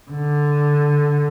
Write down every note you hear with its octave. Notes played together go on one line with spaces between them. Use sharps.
D3